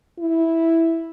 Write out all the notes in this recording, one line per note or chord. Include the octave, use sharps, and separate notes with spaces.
E4